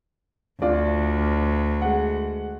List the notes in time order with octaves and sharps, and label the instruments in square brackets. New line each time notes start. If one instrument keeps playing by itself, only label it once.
[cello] D2 [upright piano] D4 F4 D5
[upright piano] G#3 F#5